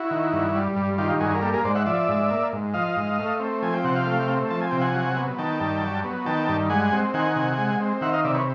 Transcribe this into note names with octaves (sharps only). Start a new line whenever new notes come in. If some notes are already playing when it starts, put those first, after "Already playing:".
Already playing: E4 F#4
D#3
G2
G3
G2
D#3 F4 G4
G2 F#4 G#4
A#4
A#3 G4 A4
G#4 A#4
G#2 C5 D5
E5 F#5
F3 D5 E5
G#2
A#3
G#2
F3 D#5 F5
G#2
A3
C4
F3 G#5
G5
C3 F#5
F5 G5
A3
C4
F3 A5
G#5
C3 G5
F#5 G#5
F#3
B3
D#3 G5 A5
G2
F#3
B3
D#3 G5 A5
G2
G#3 F#5 G#5
C4
D#3 F#5 G#5
C3
G#3
C4
D#3 E5 F#5
D#5 F5
C3 D5 E5
B4 C#5